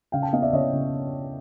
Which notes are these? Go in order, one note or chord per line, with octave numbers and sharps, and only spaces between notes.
C#3 F5 G5
G5 A5
B3 D#5 F5
D5 E5
C#3 C#5 D#5
C#3